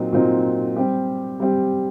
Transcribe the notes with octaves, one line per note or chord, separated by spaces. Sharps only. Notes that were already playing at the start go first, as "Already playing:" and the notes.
Already playing: A#2 F#3 C4 D#4
A#2 F#3 C4 D#4
G3 C4 G4
G3 C4 G4